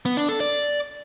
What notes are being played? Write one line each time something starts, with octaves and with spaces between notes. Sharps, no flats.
B3
D4
A4
D5